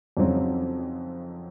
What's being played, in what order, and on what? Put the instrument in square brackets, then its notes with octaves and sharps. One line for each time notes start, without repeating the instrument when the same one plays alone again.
[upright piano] F2 C#3 F#3 C4 D#4